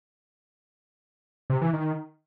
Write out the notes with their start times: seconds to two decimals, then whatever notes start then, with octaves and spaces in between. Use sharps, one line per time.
1.50 C3
1.62 E3
1.73 D#3